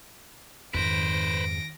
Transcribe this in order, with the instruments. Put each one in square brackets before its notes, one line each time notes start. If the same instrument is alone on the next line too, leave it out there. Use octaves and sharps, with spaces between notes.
[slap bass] F2 G#2 [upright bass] D#3 [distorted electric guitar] B4 C5 [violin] A#6 D7